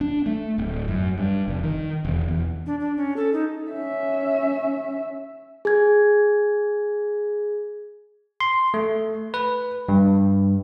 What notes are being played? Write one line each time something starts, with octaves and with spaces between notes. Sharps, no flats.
D4
A3
D1
F#2
G2
F1
D#3
E1
E2
D4
D4
C#4
A4
D#4
C#4 E5
G#4 G#6
C6
A3
B4
G2